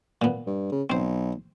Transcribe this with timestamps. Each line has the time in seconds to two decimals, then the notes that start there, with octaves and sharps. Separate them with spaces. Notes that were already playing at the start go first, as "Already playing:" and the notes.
0.22 A#2 B3
0.47 G2
0.72 C#3
0.90 B1 C4 C5